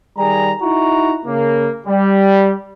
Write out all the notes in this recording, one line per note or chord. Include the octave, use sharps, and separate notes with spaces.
D#3 G3 G#4 A#5
D#4 E4 F#4 A#5
C#3 A#3
G3